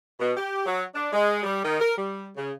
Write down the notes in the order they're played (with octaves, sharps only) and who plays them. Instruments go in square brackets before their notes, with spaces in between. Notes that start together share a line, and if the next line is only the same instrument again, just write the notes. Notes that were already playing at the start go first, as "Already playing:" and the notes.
[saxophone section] B2
G4
F#3
D4
G#3
G3
D#3
A#4
G3
C#3